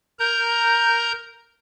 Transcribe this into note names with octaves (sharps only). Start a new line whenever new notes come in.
A#4 A#5 G6